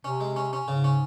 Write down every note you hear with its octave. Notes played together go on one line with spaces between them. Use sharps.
C3 C#4
G#3
C#4
C#4
G#2 C#3
C#4